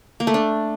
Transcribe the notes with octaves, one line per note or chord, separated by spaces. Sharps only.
A#3
A3
D4